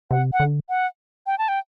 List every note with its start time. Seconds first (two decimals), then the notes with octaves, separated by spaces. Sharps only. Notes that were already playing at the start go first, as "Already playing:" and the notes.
0.11 C3 F#5
0.33 F#5
0.40 D3
0.69 F#5
1.26 G5
1.38 A5
1.48 G5